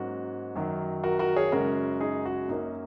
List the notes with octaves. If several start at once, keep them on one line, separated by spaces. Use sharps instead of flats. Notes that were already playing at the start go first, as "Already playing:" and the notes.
Already playing: G#2 F#3 A#3 C#4 F#4
F#2 D#3 F#3
F#4 A#4
F#4 A#4
G#4 C#5
F#2 C#3 G#3 C#4 F#4 A#4
D#4 G#4
F#4
F#2 F#3 A#3 C#4 D#4